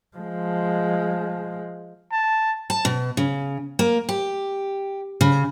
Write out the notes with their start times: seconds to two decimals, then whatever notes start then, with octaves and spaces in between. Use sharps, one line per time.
0.17 F3 G#3
2.12 A5
2.70 A5
2.85 B2
3.17 C#3
3.79 A#3
4.09 G4
5.21 C#3